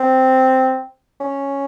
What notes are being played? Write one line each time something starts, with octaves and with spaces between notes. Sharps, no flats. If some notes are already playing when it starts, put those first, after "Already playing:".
Already playing: C4
C#4